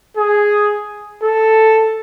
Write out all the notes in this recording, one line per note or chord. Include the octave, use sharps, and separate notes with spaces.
G#4
A4